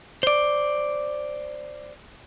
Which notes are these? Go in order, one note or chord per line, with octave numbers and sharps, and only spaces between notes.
C5 D5